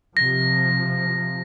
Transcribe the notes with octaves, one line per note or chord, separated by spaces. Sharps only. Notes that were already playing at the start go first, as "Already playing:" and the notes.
C3 F3 A#6